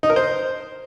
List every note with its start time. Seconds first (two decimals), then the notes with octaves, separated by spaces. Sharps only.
0.03 D#4
0.10 A#4
0.16 C5